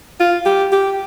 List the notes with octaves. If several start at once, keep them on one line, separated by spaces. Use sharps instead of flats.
F4
G4
G4